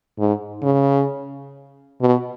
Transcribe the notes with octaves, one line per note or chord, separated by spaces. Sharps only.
G#2
C#3
B2